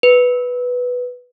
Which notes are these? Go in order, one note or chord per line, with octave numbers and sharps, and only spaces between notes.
B4